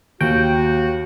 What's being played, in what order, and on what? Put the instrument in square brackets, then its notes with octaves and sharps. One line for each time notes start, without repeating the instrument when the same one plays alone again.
[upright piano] D#2 [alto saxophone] F#4 [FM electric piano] G5